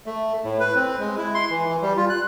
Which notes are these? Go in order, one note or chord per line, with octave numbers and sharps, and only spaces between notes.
A3
A2
B4
C4
G#3
E4
C6
E3
E3
G3
F4
F#6